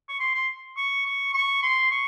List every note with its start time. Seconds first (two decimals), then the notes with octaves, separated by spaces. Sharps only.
0.09 C#6
0.20 C6
0.34 C6
0.77 C#6
1.05 C#6
1.34 C#6
1.63 C6
1.91 C#6